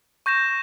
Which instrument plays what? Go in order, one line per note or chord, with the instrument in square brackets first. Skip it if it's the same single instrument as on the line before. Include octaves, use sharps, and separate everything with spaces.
[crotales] C#6 G6 A#6 E7